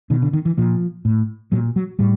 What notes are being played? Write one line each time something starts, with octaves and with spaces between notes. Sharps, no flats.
B2 D#3
D3
D#3
E3
A#2 F3
A2
A#2 F#3
F#3
A2 G3